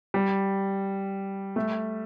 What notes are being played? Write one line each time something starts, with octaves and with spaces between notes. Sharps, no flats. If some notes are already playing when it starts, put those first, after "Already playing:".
G3
A3